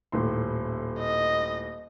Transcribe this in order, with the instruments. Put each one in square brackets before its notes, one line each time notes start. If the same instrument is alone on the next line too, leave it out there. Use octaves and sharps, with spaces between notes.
[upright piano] D#1 A2 C6
[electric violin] D#5